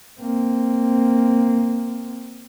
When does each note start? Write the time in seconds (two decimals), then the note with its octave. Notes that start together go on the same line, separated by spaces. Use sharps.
0.21 A#3 C4